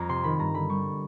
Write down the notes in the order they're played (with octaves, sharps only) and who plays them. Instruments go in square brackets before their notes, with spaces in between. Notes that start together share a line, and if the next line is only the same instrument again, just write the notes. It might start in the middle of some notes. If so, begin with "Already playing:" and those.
Already playing: [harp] F2 A#5
C3 C6
D#3 B5
G2 A#5
D3 B5
G3 C#6